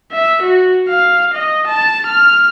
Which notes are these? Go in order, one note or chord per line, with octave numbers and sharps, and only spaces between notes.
E5
F#4
F5
D#5
A5
F6